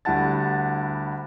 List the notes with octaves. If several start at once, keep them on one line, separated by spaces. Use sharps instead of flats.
D2 G3 E4 F#5 A5 A6